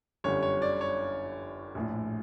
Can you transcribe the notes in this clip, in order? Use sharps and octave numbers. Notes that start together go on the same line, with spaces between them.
G1 F#2 D3 G3 C#5
C#5
D5
C#5
A#1 A2 F3